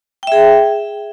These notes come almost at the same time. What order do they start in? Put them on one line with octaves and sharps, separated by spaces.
G5 E5 G#4